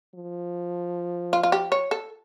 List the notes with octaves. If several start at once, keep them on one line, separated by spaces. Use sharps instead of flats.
F3
F4
F4
G4
C#5
A4